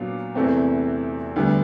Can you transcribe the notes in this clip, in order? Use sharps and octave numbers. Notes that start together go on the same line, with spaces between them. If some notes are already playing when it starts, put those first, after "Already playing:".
Already playing: A#2 F#3 B3 D4 F4
E2 C3 E3 A3 C4
D2 D3 G3 B3